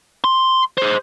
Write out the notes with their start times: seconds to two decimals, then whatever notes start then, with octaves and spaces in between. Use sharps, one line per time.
0.24 C6
0.78 G#4 C5